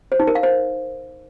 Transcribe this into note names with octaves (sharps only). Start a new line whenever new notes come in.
C5
D#4
A#4
F5
C5